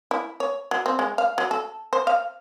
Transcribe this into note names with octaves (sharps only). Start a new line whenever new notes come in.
E4
C#5
F#3
C4
G#3
F5
F#3
A4
C5
F5